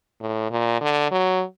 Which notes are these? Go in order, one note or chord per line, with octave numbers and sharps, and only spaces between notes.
A2
A#2
D3
F#3